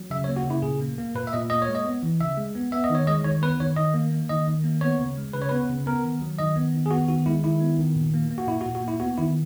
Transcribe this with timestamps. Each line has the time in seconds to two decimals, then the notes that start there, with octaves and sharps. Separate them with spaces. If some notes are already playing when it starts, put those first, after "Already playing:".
Already playing: F#3
0.10 C#3 E5
0.24 C#5
0.28 A#3
0.36 F#4
0.45 C#3 E4
0.62 A#2 G#4
0.81 A#3
0.98 A#3
1.15 A#2 B4
1.27 E5
1.33 A#2 D#5
1.50 A#3 D#5
1.62 C#5
1.68 G#3
1.75 D#5
1.85 B3
2.03 E3
2.21 C#3 E5
2.37 G#3
2.55 B3
2.72 B3 E5
2.84 D#5
2.90 D#3
2.95 C#5
3.07 G#3 D#5
3.24 D#3 C#5
3.42 B3 B4
3.60 D#3 C#5
3.77 D#3 D#5
3.94 A#3
4.12 A#3
4.29 D#3 D#5
4.48 D#3
4.64 A#3
4.81 B3 C#5
4.99 C#3
5.17 G#3
5.34 C#3 B4
5.42 C#5
5.49 B3 B4
5.70 C#3
5.86 B3 A#4
6.04 D#3
6.21 F#3
6.39 D#3 D#5
6.56 B3
6.74 D#3
6.86 G#4
6.91 B3 F#4
7.09 D#3 F#4
7.26 G#3 E4
7.44 D#3 E4
7.60 B3
7.79 D#3
7.96 A#2
8.14 A#3
8.30 A#3
8.38 F#4
8.48 A#2 E4
8.61 F#4
8.66 A#2
8.75 F#4
8.83 A#3
8.88 E4
9.00 B3 F#4
9.18 D#3 E4